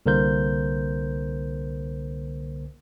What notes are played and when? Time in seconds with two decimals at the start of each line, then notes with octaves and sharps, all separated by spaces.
0.06 C2 D3 A#3 A#4 C5 G6